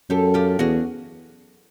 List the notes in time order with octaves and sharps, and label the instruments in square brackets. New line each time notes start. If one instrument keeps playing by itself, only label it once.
[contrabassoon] F#2 [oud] G4 A4
[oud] F4 G4
[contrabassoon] E2 [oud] F#4 G#4